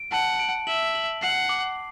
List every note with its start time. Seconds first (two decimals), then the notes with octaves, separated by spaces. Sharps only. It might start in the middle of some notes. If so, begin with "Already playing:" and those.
Already playing: D7
0.12 F#5 A5
0.40 D7
0.67 E5 F#7
0.95 F#7
1.22 F#5 C7
1.49 D6